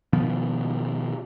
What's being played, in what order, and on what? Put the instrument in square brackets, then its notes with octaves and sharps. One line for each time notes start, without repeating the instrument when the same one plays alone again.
[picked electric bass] B2 D#3 F3 B3